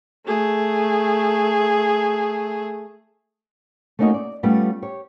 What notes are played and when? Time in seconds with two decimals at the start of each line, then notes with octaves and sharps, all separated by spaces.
0.27 A3 G#4
3.99 A3 A#3 C#4 D#4 F#4 D#5
4.14 D5
4.43 G3 A3 B3 C#4 F4
4.82 G4 C#5